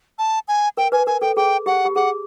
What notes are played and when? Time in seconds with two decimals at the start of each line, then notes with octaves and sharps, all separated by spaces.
0.19 A5
0.48 G#5
0.77 A#4 G5
0.92 B4 G#5
1.07 A#4 G#5
1.21 A4 G5
1.37 G#4 G5
1.66 G4 F#5
1.85 G4
1.96 G#4 F#5